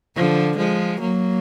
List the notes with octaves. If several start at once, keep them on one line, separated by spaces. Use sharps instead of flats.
D3 F3
F3 G#3
F#3 A#3